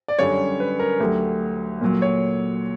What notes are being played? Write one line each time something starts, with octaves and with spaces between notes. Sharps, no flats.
D5
F#2 D3 G3 C#5
B4
A#4
D2 D3 F#3 G4
A#2 F#3
C#5